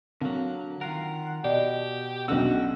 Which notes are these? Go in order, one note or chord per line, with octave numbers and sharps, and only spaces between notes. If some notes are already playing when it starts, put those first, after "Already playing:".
D3 F#3 A#3 C4
D#3 F4 A#4 F#5
B2 G4 D5 D#5
B1 D3 C#4 F#4 E6